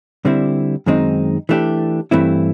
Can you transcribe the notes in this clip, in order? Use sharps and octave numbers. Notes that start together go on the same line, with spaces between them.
D3 G3 C4 E4
F#2 D#3 G#3 C4 D#4
E3 A3 D4 G4
G2 E3 A3 C4 E4